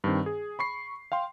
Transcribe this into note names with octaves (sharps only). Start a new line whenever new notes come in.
G2 D#3 C4
G#4
B5 C#6 C7
F5 G5 C6